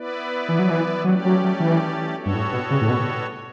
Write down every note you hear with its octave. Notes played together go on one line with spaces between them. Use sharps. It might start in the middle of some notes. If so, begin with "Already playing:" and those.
Already playing: B3 E4 B4 D5
E3
F#3
E3
F#3 A3 C#4 G4 D5
F#3
F#3
E3
G3 B3 F#4 A4 C#5
G2
A2
B2
C#3
A2
B2